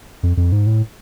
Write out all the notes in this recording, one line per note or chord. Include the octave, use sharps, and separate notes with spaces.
F2
F2
G#2
A2